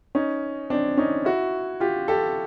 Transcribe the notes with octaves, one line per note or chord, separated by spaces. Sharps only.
C#4 D#4
C4 D4
C#4 D#4
E4 F#4
F4 G4
G4 A4